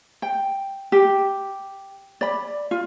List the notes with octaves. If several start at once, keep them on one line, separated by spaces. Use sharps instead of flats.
G5
G4
D5 B5
F4